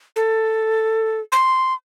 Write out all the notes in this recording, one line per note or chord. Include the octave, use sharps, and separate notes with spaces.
A4
C6